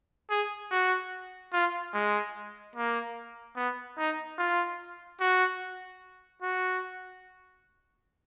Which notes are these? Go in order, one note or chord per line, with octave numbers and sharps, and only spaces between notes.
G#4
F#4
F4
G#3
A#3
B3
D#4
F4
F#4
F#4